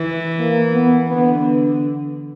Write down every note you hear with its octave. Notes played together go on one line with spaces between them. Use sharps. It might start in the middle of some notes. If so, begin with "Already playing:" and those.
Already playing: E3
A#3
B3
D3 B3